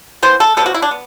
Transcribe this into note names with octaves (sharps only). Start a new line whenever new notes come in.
E3 B3 C5
A4
C3 G3 B3 A4
F#4
E4
D4
B3